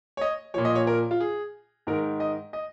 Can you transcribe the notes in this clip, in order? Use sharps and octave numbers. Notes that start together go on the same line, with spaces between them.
C#5
D#5
A#2 F3 C#5
D#5
C#5
A#4
F4
G#4
G#2 D#3 A#4
D#5
D#5